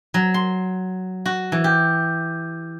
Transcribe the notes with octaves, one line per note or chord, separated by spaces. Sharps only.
F#3
C6
F#4
E3
G4